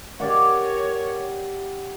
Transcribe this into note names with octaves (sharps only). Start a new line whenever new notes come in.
G4 A#4 C#5 D5 F#5